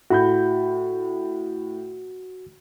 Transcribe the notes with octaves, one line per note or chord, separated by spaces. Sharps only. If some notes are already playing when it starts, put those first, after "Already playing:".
A2 F#4 B5 G6